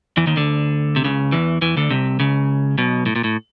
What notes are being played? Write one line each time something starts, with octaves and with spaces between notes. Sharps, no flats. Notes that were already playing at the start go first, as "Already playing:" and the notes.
E2 E3
D#2 D#3
D2 D3
C3
C#2 C#3
E2 E3
E2 E3
D2 D3
C2 C3
C#2 C#3
B1 B2
A2
A#2
A2